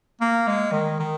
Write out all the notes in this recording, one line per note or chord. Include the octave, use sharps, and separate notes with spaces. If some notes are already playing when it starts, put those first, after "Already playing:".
A#3
G#3
D#3
D#3